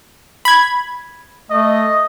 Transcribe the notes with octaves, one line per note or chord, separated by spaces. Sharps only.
B5 G#6
A3 D#5